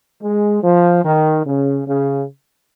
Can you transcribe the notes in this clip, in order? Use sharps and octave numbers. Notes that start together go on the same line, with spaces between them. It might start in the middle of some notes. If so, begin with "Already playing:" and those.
G#3
F3
D#3
C#3
C#3